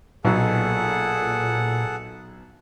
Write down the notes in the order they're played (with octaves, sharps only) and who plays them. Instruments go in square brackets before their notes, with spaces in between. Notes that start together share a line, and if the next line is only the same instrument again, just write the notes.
[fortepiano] B1 D#4 [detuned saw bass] A#2 [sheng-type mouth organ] G#4 A4 F#5